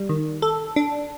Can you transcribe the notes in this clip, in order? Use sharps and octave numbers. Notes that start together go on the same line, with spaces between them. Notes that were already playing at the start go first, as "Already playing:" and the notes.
Already playing: G3
D#3
A4
D4